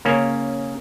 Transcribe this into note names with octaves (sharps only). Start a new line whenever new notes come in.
C#3 A#3 C#4